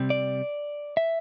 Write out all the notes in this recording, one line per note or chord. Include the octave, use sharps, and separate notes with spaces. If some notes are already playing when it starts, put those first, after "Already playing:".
Already playing: C3 G3 C4
D5
E5